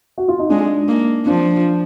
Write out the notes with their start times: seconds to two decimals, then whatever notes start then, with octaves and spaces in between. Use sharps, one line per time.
0.18 F#4
0.28 F4
0.39 D#4
0.49 G#3 D4
0.88 A#3
1.26 F3 D4